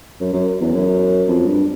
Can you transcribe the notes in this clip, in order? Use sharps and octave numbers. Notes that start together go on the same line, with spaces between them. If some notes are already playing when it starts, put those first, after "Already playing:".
F#2
F#2
E2
F#2
F2
G2